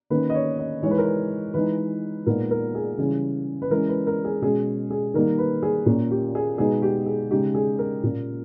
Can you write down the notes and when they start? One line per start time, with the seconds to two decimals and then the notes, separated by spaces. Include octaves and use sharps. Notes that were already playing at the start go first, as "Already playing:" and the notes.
0.10 D#3 A#3 C#4 B4
0.30 D#5
0.34 C#5
0.59 D#5
0.83 E3 G#3 D#4 C#5
0.91 B4
0.98 A#4
1.06 B4
1.54 E3 G#3 D#4 B4
2.26 A#2 G#3 B3 D#4 A#4
2.51 A#4
2.75 G#4
2.98 C#3 E3 G3 C#4 G#4
3.62 B4
3.70 E3 G#3 C#4 A#4
3.89 B4
4.07 A#4
4.25 G#4
4.42 B2 G#3 C#4 G#4
4.91 G#4
5.14 D#3 G3 A#3 D#4 A#4
5.39 B4
5.63 G#4
5.86 A#2 A#3 C#4
6.11 G4
6.35 G#4
6.58 B2 G#3 B3 D#4 G#4
6.82 G4
7.06 G#4
7.31 C#3 G#3 D#4 G4
7.55 G#4
7.79 A#4
8.03 A#2 A#3 C#4